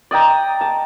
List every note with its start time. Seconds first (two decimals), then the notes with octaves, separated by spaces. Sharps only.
0.11 D5 D#5 G5 A#5
0.61 A5